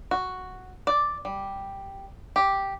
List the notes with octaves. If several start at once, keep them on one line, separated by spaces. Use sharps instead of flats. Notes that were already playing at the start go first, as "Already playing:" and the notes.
F#4
D5
G3
G4